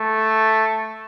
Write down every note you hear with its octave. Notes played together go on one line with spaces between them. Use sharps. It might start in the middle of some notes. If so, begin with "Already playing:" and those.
Already playing: A3